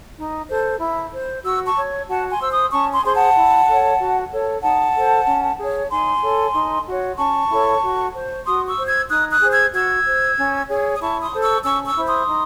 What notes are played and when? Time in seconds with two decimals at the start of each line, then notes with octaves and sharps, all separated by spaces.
0.17 D#4
0.49 A4 C5
0.81 E4
1.13 C5
1.44 F#4 C#6 E6
1.65 A5 C#6
1.76 C#5
2.08 F#4 F#5 A5
2.29 G#5 C6
2.40 C5 E6
2.51 C6 D#6
2.71 C#4 A5 C#6
2.93 G#5 C6
3.03 G#4 C5 C6
3.14 F#5 A5
3.36 E4
3.68 A4 C#5
3.99 F#4
4.31 A4 C#5
4.63 D#4 F#5 A5
4.95 A4 C5
5.27 C#4
5.59 G#4 C#5
5.90 D#4 G#5 C6
6.22 A4 C#5
6.54 D#4
6.87 F#4 C#5
7.18 C#4 A5 C#6
7.50 E4 A4 C#5
7.82 F#4
8.14 C5
8.46 F#4 C6 D#6
8.67 C#6 E6
8.77 C5
8.88 E6 G#6
9.09 D#4 D#6 F#6
9.31 D#6 F#6
9.42 G#4 C5
9.52 E6 G#6
9.73 F#4 E6 G#6
10.05 C5
10.38 C#4
10.69 G#4 C#5
10.95 D#6
11.00 E4 A5 C#6
11.22 C6 D#6
11.33 A4 C5
11.43 C#6 E6
11.64 C#4 C#6 E6
11.86 C#6 E6
11.97 E4 C5
12.07 C6 D#6
12.28 D#4